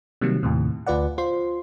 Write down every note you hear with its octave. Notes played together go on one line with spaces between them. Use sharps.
C3 D#3 F#3 G3 A#3
D#2 A2 C3
D2 F4 B4 D5 F#5
F4 C5 C6